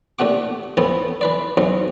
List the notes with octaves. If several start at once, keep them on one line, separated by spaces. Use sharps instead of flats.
D#2 A#2 A3 F#5 D6
A2 E3 F3 A3 B3
E3 B4 D5
B1 G#2 E3 F#3